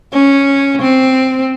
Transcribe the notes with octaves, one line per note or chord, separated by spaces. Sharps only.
C#4
C4